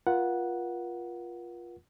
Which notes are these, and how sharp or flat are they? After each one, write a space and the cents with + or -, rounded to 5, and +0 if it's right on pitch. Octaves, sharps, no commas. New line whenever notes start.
F4 +0 A#4 +45 F#5 +0